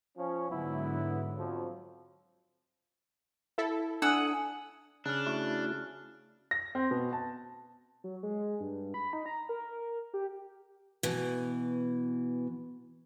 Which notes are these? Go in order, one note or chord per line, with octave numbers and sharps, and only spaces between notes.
F3 C#4
G#2 D3 F#3 B3 E4
F2 F3 F#3
E4 A4
D4 F#5 G#5 D#6 E6
C#3 D4 F6 F#6
A3 E4 F#4
A#6
C4
B2
A5
F#3
G#3
G2
B5
D#4
A#5
A#4
G4
B2 E3